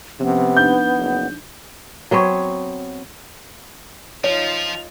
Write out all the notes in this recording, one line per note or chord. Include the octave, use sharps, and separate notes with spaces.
C3 F3 B3 C#4
D4 D#4 G6
F#1
F#3 B3 C4 C#5
F3 D#4 F4 C#5 F7